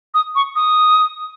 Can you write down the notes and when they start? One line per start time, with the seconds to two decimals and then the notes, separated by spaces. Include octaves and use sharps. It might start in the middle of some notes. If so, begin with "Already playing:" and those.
0.14 D#6
0.35 C#6
0.56 D#6